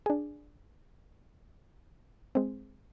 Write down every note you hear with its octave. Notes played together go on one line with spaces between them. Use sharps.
D4 G#4
G#3 C4